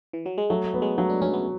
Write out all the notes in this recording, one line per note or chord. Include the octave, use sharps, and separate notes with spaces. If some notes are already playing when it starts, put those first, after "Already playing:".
E3
F#3
G#3
F#3 A3
A3
B3
G#3
F#3 A3
D4
F#3 C#4
B3